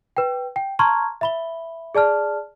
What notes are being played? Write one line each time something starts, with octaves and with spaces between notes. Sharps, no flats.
B4 G5
G5
A5 A#5 C6 C#6 F6 G#6
E5 B5 G7
G#4 D5 A5 F6